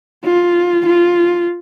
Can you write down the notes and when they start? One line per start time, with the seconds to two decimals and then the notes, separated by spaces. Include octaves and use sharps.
0.24 F4
0.86 F4